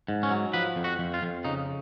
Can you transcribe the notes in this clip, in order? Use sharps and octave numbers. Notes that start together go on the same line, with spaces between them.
G#2
C#4
F#3
F3 B4
F2
F#4
F2
F4
F2
C#3 D#4